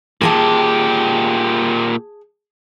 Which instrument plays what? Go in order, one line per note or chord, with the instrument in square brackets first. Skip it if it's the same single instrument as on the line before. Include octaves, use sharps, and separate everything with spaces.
[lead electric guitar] A#2 G4 [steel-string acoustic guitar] G#4 G#5 A5